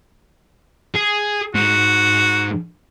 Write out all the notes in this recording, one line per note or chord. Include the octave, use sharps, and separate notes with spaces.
G#4
G#2 F#4